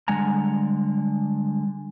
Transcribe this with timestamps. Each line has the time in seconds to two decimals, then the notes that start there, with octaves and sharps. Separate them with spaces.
0.08 D3 G3 G#3 F#5 G#5 A#5